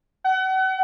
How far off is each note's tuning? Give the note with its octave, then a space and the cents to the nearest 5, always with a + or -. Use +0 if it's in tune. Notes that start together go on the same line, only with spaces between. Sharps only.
F#5 +35